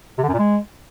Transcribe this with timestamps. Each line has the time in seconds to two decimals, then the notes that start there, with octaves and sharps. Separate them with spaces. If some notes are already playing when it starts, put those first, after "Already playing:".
0.18 C3
0.23 D3
0.28 F#2
0.33 A#2
0.39 G#3